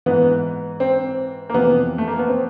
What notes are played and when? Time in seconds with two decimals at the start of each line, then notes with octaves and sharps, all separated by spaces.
0.06 G#2 E3 B3
0.80 C4
1.49 A#3
1.54 F2 C3 E3 B3
1.98 A3
2.08 A#3
2.19 B3
2.29 C4